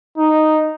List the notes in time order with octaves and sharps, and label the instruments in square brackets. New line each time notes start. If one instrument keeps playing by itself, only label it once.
[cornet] D#4